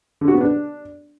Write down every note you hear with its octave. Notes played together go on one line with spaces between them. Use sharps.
D3
F#4
B3
D4